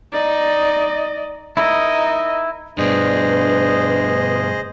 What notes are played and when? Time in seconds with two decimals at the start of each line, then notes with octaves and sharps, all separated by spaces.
0.13 D#4 D5 D#5
1.57 D#4 E4 A#4 D#5
2.78 G2 B2 D4 G#4 B4 C5 D#5